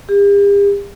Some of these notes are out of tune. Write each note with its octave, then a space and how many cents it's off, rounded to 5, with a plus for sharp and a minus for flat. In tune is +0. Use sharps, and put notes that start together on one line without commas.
G4 +45